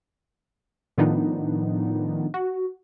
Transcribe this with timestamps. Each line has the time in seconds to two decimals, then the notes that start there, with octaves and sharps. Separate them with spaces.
0.98 A2 D#3 F3 B3 D4 D#4
2.34 F#4